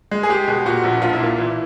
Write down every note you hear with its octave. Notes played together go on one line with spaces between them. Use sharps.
G#3
G#4
G#3 G4
B2
A#2 F#4
A#1
B1 F4
E4
A#2 F4
E3 E4